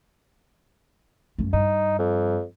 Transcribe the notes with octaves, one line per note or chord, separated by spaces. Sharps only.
F#2 A3
G2 D#4
F2